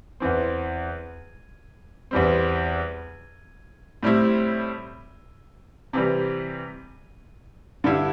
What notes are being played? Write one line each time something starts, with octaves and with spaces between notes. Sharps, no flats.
E2 E3 C4
E2 E3 G3 C4
A2 G3 C4 E4
C3 E3 G3
G2 D3 G3 E4